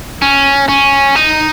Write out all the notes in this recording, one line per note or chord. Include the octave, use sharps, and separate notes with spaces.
C#4
C#4
D#4